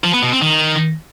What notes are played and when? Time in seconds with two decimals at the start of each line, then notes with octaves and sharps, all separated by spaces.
0.04 F3
0.13 B3
0.23 B2
0.32 C4
0.42 D#3